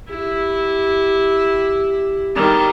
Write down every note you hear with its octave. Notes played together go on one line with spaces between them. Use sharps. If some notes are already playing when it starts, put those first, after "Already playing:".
E4 G4
D#3 G3